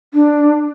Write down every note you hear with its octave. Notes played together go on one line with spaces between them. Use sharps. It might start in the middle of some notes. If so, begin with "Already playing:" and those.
D4